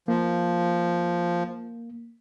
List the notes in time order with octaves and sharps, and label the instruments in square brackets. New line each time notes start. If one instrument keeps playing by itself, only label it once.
[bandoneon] F3 [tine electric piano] A#3